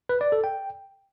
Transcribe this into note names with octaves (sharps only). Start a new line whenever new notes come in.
B4
D5
A4
G5